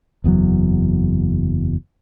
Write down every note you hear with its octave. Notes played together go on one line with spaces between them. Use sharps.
F#1 E2 A#2 F#3